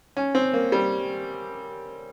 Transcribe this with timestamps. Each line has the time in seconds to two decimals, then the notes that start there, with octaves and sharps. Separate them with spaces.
0.17 C#4
0.35 C4
0.53 A#3
0.72 G3